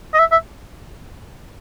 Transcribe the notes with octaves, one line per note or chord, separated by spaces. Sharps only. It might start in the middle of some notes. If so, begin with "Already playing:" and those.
D#5
E5
E5